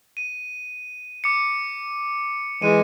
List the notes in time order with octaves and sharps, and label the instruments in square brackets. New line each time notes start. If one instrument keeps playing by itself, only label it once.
[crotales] D#7
D6 C#7
[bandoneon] E3 G#3 [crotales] D#7